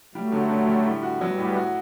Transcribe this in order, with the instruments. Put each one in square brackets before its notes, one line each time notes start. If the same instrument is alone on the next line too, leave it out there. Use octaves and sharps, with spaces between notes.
[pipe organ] F#3 A3 [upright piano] G3
[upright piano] D3
D3
G3
A2
F#4
[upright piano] F#3 [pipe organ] G3 B3
[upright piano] A2
F#4